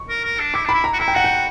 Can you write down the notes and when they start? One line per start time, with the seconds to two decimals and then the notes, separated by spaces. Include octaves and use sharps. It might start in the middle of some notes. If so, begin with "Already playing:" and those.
Already playing: C#6
0.09 A#4
0.24 A#4
0.39 D4
0.54 E4 D6
0.65 D4 B5
0.74 E4
0.84 A#5
0.93 F#4
0.99 E4 A#5
1.08 G5
1.15 F#4 F#5
1.24 G5